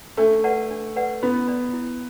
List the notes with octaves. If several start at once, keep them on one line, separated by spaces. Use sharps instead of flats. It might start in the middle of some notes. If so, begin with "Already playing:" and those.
A3 D4
B4 D5 F#5 A5
D4
B4 D5 F#5 A5
B3 E4
D5 B5
E4